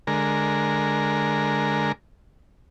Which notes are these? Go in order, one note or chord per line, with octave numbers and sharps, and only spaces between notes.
D3 G#3 A#4